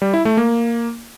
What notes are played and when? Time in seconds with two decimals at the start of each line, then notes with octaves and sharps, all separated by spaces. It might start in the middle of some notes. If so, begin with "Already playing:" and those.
0.02 G3
0.13 E4
0.25 A3
0.37 A#3